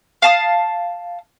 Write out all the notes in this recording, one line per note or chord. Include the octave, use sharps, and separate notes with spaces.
F5 A5 D#6